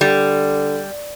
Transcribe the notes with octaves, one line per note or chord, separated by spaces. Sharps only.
D3 G3